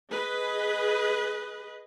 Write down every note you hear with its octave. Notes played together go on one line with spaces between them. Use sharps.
G#4 B4 D#5